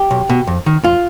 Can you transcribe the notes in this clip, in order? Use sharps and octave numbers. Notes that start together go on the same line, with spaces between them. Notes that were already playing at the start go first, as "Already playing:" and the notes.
Already playing: G4
B1
B2
F2
D#3
F2 F4